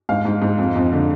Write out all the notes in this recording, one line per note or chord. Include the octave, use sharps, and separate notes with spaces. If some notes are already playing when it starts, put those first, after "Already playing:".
G#2 F5
G#2
G#2
F2
F2
D3